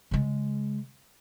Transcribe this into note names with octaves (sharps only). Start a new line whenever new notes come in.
C#3 G#3